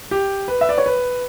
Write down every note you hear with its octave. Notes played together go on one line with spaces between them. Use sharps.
G4
B4
E5
D5
C#5
B4